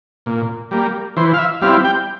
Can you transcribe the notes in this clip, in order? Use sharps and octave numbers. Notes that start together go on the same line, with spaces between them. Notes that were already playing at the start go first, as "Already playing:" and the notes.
A#2
G3 A#3
E3 C5
F5
E5
G3 C4 E4 F5
G5